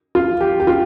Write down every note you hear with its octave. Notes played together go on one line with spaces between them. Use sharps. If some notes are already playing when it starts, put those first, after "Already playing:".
F4
G4
G4
F4